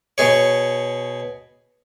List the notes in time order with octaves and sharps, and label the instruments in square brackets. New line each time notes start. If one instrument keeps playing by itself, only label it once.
[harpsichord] B2 G#4 C#5